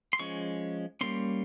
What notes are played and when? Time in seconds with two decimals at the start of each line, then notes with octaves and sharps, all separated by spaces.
0.13 C6
0.19 F3 G#3 C#4 C#6
1.01 G3 A#3 C#4 C6